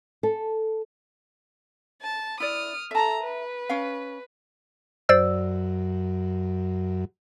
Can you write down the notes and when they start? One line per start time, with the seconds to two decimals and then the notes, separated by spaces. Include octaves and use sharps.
0.23 A4
2.02 A5
2.40 E4 D5 D#6 F6
2.91 A4 E5 A5 A#5
3.23 B4
3.69 C#4 F5
5.09 F#2 C5 D5 E6